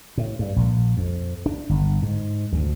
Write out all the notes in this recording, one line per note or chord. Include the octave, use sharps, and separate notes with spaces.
A2
G2
A#1
F2
D4
G1
G#2
D2